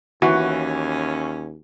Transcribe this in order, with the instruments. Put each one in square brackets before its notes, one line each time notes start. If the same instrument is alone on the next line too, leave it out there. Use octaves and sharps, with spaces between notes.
[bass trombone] D#2 [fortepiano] E3 [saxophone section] C#4 [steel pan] F#4